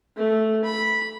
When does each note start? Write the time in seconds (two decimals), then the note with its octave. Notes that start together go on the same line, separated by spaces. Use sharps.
0.16 A3
0.65 B5